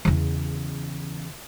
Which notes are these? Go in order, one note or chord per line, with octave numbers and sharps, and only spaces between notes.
E2 C#3